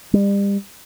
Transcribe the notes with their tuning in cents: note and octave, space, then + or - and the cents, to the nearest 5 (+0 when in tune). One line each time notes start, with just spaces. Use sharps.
G3 +35